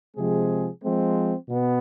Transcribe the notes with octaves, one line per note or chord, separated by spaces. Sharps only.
C3 F3 G#3 C4 G#4
F3 G#3 C4
B2 B3